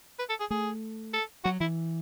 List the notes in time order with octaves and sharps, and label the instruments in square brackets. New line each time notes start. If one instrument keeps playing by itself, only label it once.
[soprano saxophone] B4
A4
G#4
[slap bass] A3 [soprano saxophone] G#4
[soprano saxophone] A4
[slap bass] F#3 [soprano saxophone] F#4
[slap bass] E3 [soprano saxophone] E4